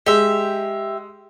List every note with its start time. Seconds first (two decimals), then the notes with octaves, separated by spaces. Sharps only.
0.06 G#3 G4 E5